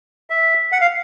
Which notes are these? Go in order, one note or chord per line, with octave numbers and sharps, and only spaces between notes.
E5
F#5
F5